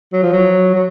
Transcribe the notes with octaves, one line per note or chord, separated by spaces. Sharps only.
F#3
F3
F#3
F#3